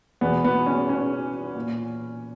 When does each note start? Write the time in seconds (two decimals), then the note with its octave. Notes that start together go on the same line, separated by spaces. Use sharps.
0.21 E2 B2 B3
0.44 B3
0.66 C#4
0.89 C#4
1.55 A#2